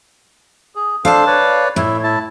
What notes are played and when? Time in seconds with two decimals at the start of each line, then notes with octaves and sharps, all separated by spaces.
0.75 G#4
1.05 D4 A4 C5 F5 A5
1.27 B4 C#5 D5
1.76 A2 E4
2.04 E4 A5